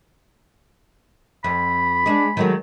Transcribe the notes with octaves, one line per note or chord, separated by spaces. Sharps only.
F2 B5
G#3 D4 G#4
D#3 F#3 G#3 A3